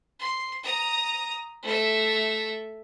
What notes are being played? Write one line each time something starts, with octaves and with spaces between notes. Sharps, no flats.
C6
A#5 D#6
A3 E5